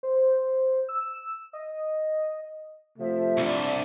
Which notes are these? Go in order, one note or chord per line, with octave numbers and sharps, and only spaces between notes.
C5
E6
D#5
C3 F3 A3 E5
C2 D4